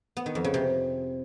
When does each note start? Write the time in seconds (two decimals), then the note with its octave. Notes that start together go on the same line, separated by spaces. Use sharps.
0.17 B3
0.26 D#3
0.35 F2
0.44 C#3
0.54 C3